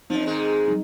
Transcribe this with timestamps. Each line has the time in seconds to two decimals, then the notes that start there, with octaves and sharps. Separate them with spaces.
0.10 F#2 F3 C4 D#4
0.26 G#2 D#3 G#3
0.68 F#3 G3 D#4